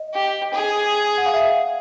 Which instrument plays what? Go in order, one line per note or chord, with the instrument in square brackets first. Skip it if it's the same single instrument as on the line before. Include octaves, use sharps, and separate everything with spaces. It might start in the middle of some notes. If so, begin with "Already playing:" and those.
Already playing: [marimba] D#5
[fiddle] G4
G#4
[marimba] F#5
F5
E5